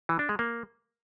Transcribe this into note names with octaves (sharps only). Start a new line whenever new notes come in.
E3
D4
G#3
A#3